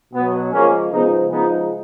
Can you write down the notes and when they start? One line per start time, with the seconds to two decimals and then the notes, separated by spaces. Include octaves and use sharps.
0.13 B2 F#3 B3
0.52 C#3 F3 G#3 A#3 C#4
0.92 C#3 F3 G#3 B3 D#4
1.31 C#3 F3 G#3 B3 D#4